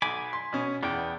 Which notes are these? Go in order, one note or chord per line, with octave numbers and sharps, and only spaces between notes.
B1 G#5 B5 D6
C6
B2 C#4
E2 B3 G5